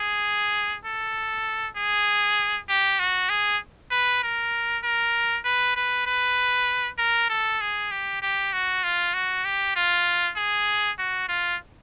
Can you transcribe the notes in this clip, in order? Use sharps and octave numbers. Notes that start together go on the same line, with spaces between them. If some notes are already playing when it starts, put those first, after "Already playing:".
Already playing: G#4
A4
G#4
G4
F#4
G#4
B4
A#4
A#4
B4
B4
B4
A#4
A4
G#4
G4
G4
F#4
F4
F#4
G4
F4
G#4
F#4
F4